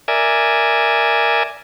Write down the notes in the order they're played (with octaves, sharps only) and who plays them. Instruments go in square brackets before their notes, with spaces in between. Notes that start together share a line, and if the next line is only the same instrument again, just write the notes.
[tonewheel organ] A#4 D5 E5 G#5